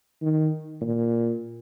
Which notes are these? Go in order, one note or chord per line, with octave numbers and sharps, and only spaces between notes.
D#3
A#2